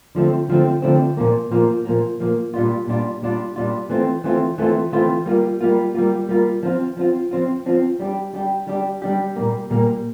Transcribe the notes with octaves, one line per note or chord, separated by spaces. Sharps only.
D3 F3 A3 C4
D3 F3 A3 C4
D3 F3 A3 C4
A#2 F3 A#3
A#2 F3 A#3
A#2 F3 A#3
A#2 F3 A#3
A#2 G3 D4 F4
A#2 G3 D4 F4
A#2 G3 D4 F4
A#2 G3 D4 F4
E3 A3 C4 F4
E3 A3 C4 F4
E3 A3 C4 F4
E3 A3 C4 F4
G3 A#3 F4
G3 A#3 F4
G3 A#3 F4
G3 A#3 F4
F3 C4 F4
F3 C4 F4
F3 C4 F4
F3 C4 F4
G3 D4 G4
G3 D4 G4
G3 D4 G4
G3 D4 G4
A#2 G3 A#3
A#2 G3 A#3